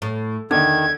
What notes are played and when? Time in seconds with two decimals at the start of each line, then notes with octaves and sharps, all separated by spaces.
0.02 A2
0.51 E2 D3 D#3 G#6